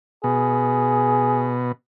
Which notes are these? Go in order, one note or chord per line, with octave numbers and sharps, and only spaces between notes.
B2 G#4